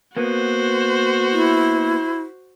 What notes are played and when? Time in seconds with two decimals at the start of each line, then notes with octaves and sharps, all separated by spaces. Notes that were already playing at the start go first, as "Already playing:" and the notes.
0.17 A#3 B3 F#4 C5
1.32 E4